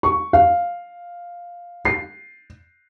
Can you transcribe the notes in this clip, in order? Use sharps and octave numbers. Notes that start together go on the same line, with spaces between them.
C#6
F5
C7